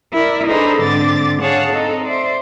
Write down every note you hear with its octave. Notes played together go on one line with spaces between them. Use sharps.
E4 A#4 D5
D4 D#4 G#4 A4 B4 C5
G#2 D3 C4 D6 A6
G#4 C#5 F5 F#5 A5
C4 D#4 A4 D#5
C5 D5 E5